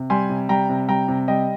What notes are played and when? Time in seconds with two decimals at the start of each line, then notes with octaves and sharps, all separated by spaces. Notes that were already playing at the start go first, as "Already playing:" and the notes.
Already playing: C3
0.10 G3 G#5 C6
0.29 C3
0.49 G3 G5 A#5
0.69 C3
0.88 G3 G5 A#5
1.08 C3
1.28 G3 D#5 G5